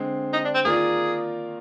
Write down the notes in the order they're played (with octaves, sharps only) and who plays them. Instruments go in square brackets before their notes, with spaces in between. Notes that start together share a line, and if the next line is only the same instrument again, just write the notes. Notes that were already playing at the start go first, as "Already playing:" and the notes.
Already playing: [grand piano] D3 G#3 C4
[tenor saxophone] D#4
D4
C4
[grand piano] D#3 A#3 F4 A#4 D5 [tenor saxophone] G#4